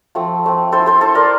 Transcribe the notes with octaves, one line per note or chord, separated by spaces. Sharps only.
F3 A3 C4
F3 A3 C4
A3 E4 A4 C5
A4 C5
A3 E4 A4 C5
A#4 D5